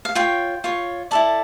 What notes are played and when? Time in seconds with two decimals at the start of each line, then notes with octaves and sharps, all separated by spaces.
0.05 F5
0.15 F4 C#5 G5
0.64 F4 C#5
1.11 E4 A4 D5 A5